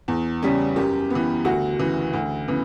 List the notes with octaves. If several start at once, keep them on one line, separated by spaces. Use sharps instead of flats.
E2
C#3 G3 C#4
F#2 G4
E3 B3
D2 F#4
C#3 E3
D2
C#3 E3 B3